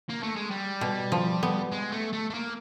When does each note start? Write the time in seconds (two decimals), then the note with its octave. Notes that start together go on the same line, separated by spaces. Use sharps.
0.09 A#3
0.23 A3
0.36 G#3
0.50 G3
0.81 B2
1.12 F3
1.43 B3
1.72 G#3
1.93 A3
2.13 A3
2.30 A3
2.34 A#3